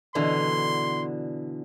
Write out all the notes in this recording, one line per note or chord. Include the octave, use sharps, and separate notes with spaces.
B2 D3 E3 C6